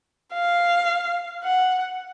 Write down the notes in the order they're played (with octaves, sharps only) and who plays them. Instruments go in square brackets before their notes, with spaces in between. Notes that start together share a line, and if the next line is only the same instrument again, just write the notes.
[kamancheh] F5
F#5